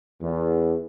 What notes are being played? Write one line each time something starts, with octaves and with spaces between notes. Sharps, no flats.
E2